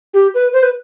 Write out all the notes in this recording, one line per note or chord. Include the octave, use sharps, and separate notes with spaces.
G4
B4
C5
B4